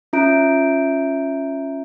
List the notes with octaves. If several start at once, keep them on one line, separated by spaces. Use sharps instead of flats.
C#4 F4 E5 A#5 G6 D7